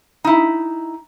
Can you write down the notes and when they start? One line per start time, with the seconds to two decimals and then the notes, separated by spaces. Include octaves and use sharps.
0.24 D#4 E4